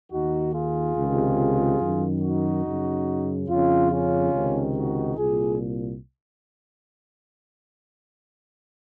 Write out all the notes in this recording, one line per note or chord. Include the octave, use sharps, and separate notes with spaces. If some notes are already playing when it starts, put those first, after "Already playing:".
D#2 D#3 D#4 F#4
F4 G#4
C#2 C3 D#3
F#2 D#3
D#4 F#4
F#2 C#3
F2 C#3 C#4 F4
C#4 F4
C#2 C3 D#3
D#4 F#4
C2 A#2 F4 G#4